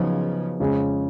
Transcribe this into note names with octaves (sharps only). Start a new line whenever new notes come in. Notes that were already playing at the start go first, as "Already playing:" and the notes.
Already playing: C#3 F3 F#3 B3 D#4
F2 C#3 G#3 C#4 G#4